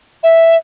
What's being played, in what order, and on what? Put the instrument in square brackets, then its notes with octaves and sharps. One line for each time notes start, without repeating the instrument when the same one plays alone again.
[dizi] E5